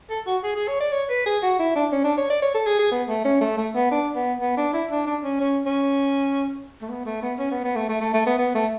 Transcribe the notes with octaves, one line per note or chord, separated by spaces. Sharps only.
A4
F#4
G#4
G#4
C#5
D5
C#5
B4
G#4
F#4
E4
D4
C#4
D4
C#5
D5
C#5
A4
G#4
G#4
B3
A3
C#4
A3
A3
B3
D4
B3
B3
D4
E4
D4
D4
C#4
C#4
C#4
A3
B3
A3
B3
C#4
B3
B3
A3
A3
A3
A3
B3
B3
A3